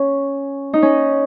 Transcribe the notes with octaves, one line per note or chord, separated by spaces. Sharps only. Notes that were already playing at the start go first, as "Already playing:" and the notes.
Already playing: C#4
D#4
C#4